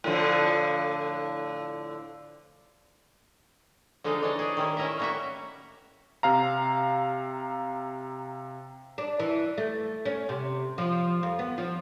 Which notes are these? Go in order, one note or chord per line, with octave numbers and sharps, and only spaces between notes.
A2 D3 F3
D3 F3 G#3 D#4 F4 A4
E3 D4 D#4 C#5 D#5 A5
G#4 D5
D#3 G3 E4
C#4 E4 A#4 D#5 E5
G3 A#3 C#4 F#4 C#5 E5
C3 F5 A#5
D4
E3
A3
C#4
C3
F3
F2
B3
F3